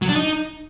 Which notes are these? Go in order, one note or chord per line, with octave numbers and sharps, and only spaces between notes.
F#3
D4
D#4